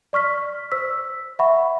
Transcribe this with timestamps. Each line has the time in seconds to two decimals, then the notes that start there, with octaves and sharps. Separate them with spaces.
0.13 D5 C#6 F6 B6
0.71 C5 E6 B6
1.39 E5 F#5 B5 C#6